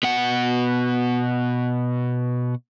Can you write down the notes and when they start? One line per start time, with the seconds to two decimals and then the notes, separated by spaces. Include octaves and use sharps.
0.03 B2 F#5